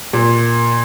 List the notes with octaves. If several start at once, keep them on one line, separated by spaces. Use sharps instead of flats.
A#2